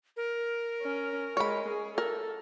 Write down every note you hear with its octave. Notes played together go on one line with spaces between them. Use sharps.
A#4
C#4
G#3 C#5 B5
G#4
A4 A#4